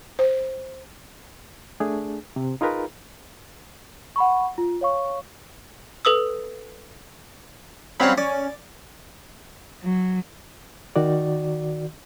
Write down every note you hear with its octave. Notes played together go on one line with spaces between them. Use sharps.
C5
A3 D4 G#4
C3
D#4 F4 G#4 A#4 B4
F#5 B5 C#6
F4
C#5 F5 C#6
A4 B4 D#6 E6
F#3 G3 C4 C#4 F5 B5
C#4 D5
F#3
D#3 F#4 D5